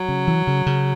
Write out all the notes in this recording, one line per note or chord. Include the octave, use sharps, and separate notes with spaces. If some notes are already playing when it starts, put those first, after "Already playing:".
Already playing: F#3
C#3
E3
C#3
C#3